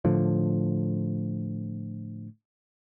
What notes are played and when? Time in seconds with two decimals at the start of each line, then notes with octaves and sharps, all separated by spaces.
0.05 A2 D3 F3